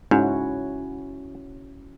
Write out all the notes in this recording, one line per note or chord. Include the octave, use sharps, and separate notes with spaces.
G#2 C#4 E4 F#4